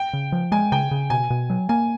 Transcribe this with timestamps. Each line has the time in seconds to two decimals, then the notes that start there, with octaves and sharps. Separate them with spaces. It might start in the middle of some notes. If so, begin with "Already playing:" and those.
Already playing: G5
0.13 C#3
0.32 F3
0.52 G#3 G#5
0.72 C#3 G5
0.91 C#3
1.10 B2 G#5
1.30 B2
1.50 F#3
1.69 A#3 G#5